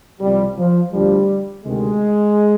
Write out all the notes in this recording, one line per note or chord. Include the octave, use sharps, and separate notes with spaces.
C2 C3 F3 G3
F3
D2 D3 F3 G3
D2 C3 D#3 G#3